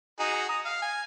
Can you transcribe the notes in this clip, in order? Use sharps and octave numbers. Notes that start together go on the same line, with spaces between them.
D#4 F#4 G#4
A#5 D#6
F5
G#5